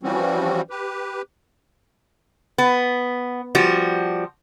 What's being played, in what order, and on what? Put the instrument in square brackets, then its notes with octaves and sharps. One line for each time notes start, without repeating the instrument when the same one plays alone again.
[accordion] E3 F3 G3 C4 C#4 F#4
G4 B4
[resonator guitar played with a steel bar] B3
F3 G3 F#4